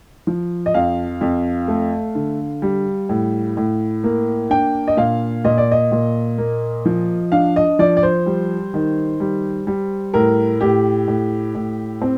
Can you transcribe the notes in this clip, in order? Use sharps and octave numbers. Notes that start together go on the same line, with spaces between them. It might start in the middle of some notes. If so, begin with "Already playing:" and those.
F3
D#5
F2 F5
F2
A3
D3
G3
A2
A2
A#3
D4 G5
D#5
A#2 F5
A#2 D#5
D5
D#5
A#2
A#3
F3
D4 F5
D#5
F3 D5
D5
C5
G3
D#3
G3
G3
A2 A#4
A2 G4
A2
A2
C4